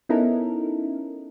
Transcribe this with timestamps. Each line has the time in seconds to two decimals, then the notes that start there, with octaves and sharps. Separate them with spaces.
0.09 B3 C#4 D#4 E4 A4 A#4